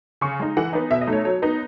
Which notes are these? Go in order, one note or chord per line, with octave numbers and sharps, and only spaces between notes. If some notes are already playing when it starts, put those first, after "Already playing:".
C#3 C#6
G#3 D#4
E3 F#5
B3 D#4
B2 E5
D#5
A3 D#4
C#5
F#3 C#5
B3 D#4